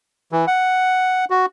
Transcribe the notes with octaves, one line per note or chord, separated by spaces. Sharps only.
E3
F#5
F#4